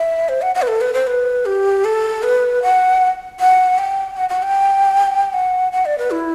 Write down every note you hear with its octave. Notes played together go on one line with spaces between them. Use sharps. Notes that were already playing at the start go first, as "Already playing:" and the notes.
Already playing: E5
C5
F#5
F#5
B4
A4
B4
C5
B4
G4
A4
B4
F#5
F#5
G5
F#5
F#5
G5
F#5
F#5
D5
B4
E4